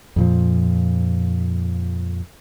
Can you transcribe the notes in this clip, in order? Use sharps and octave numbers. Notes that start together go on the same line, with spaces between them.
F2 A#2 F3